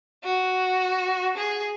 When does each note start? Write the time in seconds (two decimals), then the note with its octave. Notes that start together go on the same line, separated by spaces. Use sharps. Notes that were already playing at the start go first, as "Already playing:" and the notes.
0.24 F#4
1.37 G#4